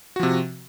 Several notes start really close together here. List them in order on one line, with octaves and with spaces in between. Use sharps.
F#4 F3 C3